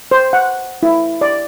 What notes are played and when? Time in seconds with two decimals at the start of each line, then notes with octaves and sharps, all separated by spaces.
0.11 C5
0.33 F#5
0.83 E4
1.21 D5